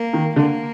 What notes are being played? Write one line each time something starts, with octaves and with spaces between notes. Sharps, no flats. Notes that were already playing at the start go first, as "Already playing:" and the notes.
Already playing: A#3
D#3
D3 A#3